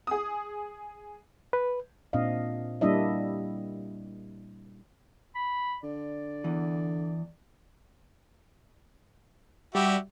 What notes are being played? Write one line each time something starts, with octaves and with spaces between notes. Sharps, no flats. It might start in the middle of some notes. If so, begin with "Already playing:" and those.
G#4 D#6
B4
A#2 C4 D4 D#5 F5
G3 A#3 D4 E4 D#5 E5
B5
D3 D5
E2 E3
G3 F#4 G4 E5